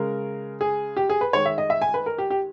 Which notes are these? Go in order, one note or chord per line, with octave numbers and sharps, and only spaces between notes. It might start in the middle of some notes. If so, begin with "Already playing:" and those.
Already playing: C#3 G#3 A#4
G#4
G4
G#4
B4
D#3 G#3 C#5
E5
D#5
E5
G#5
B4
A#4
G4
G4